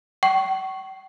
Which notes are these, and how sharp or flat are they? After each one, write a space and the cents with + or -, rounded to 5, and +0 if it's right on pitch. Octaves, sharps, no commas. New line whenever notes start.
G5 -45 C#6 -10